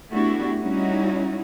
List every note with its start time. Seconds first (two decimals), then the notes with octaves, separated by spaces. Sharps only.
0.12 A3 B3 D4 E4 F#4 G4
0.60 G3 C#4 D#4 E4 F#4